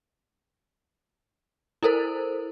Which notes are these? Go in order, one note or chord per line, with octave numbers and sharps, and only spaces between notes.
E4 A4 A#4 C5